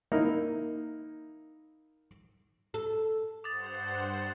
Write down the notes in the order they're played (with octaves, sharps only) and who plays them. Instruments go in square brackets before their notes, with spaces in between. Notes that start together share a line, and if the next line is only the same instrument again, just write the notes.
[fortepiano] A#3 D#4 E4
[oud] A4
[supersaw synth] G2 C5 F#5 [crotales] D6 D#6 A6